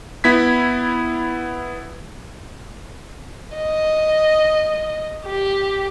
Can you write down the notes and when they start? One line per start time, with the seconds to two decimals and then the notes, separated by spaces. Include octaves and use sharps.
0.24 B3 E4 G#6 B6
3.57 D#5
5.25 G4